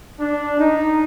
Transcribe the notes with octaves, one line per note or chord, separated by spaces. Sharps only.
D4
D#4